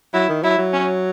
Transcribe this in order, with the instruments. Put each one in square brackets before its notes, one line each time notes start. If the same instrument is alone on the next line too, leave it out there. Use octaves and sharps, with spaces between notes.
[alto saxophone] F#3 [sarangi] E4
[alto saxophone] D#3
[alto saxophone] F#3 [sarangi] E4
[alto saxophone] F#3
[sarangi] C#4